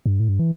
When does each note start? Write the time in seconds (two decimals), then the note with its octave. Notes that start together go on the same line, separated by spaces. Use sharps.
0.06 G2
0.20 A2
0.29 G2
0.39 E3